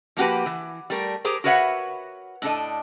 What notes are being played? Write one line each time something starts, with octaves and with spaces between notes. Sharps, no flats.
F3 A#3 F#4 G4 B4
E3
G3 A3 A#4
G4 G#4 A#4 C5
F#4 A#4 B4 C#5 E5 F#5
A2 D4 A4 D#5